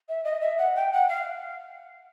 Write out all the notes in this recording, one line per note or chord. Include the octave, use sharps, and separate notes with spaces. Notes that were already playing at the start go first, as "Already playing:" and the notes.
E5
D#5
E5
F#5
G5
F#5
F5